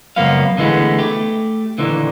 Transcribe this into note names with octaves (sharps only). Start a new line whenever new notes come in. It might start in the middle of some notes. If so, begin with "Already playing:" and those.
C#2 F#2 F3 A#3 B3 F5
D3 E3 G#3 A3 B3
A3 G4
D#2 A#2 D3 E3